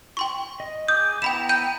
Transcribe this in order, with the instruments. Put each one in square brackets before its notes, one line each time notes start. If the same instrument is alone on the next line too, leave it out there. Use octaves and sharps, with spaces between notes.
[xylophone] G5 C6 C#6
[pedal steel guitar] D#5
[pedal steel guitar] G#4 D6 G6 [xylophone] D#6
[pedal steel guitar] B3 E4 A#5 [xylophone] G5 B5 E7
[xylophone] G5 G6 D#7